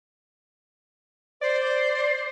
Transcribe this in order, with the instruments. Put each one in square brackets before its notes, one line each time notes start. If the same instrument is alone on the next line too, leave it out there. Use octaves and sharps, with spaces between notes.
[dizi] C5 [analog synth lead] D5